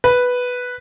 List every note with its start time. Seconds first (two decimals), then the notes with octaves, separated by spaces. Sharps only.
0.04 B4